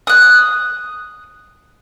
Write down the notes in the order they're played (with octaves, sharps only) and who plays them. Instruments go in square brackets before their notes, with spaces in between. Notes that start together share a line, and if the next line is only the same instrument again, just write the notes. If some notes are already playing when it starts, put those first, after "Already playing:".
[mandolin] D#6 F#6